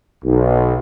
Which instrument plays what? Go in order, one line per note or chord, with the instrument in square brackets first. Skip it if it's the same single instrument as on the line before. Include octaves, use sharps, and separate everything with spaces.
[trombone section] B1